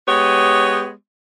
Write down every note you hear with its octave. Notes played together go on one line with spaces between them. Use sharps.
G#3 B3 G4 C#5